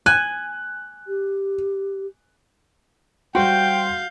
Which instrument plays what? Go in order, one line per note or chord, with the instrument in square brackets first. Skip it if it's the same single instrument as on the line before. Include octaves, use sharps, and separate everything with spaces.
[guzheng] G#5 [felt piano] F#6
[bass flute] G4
[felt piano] G3 C5 C6 [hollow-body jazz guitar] F#4 [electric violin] F5 G6 [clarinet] G5